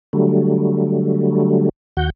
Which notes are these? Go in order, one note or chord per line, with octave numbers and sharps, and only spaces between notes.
D3 F#3 G3 A3
D#2 F#4 F#5 G6